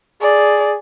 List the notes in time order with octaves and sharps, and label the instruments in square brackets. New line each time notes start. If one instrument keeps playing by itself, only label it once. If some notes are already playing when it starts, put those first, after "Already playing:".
[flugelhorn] G#4 [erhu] D5